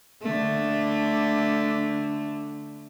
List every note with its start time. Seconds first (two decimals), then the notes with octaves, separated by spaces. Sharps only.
0.23 D3 A3